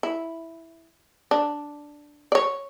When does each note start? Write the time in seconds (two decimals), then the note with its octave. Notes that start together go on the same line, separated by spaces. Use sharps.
0.03 E4
1.31 D4
2.32 C#5 D5